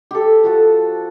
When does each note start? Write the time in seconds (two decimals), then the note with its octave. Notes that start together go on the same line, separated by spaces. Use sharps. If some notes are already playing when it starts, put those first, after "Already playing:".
0.11 G4 A4
0.44 F3 F#4 A4